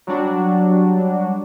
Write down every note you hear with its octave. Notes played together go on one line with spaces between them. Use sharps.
F#3 G3 D4 F#4